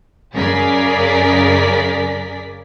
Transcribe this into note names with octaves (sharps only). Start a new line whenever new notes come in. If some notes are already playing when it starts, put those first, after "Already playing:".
F#2 C#3 G#4 A#4 D5 B6